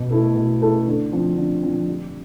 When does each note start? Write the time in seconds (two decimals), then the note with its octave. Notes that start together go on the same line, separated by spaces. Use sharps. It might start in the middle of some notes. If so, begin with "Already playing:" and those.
Already playing: B2
0.11 A3 E4 A4
0.35 B2
0.61 A3 E4 A4
0.87 D3
1.12 F3 C4
1.37 D3
1.63 F3 C4
1.88 G3